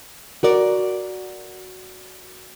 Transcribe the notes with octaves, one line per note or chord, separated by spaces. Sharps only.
F#4 A#4 D5